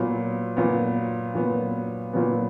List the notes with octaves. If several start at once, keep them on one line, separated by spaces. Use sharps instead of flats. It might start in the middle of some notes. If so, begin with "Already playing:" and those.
Already playing: A#2 F#3 B3
A#2 F#3 B3
A#2 F#3 B3
A#2 F#3 B3